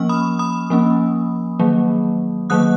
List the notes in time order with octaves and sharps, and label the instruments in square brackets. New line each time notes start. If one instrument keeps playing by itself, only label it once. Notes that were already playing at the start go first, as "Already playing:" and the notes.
Already playing: [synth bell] F3 A#3 C#4 C#6 F6
B5 D#6
B5 D#6
F3 A#3 C#4
D#3 F#3 A#3
D#3 F#3 A#3 D#6 F#6